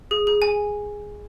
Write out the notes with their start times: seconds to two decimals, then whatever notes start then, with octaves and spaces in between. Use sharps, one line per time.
0.11 G#4
0.27 G#4
0.42 G#5